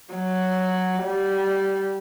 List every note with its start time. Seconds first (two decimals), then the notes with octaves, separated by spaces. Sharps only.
0.14 F#3
1.04 G3